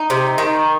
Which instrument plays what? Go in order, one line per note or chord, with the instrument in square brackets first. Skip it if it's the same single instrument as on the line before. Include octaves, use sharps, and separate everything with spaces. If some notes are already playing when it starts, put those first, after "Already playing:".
Already playing: [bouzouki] D#4
C3
D#3